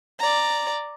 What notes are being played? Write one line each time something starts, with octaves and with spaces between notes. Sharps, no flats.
D5 A#5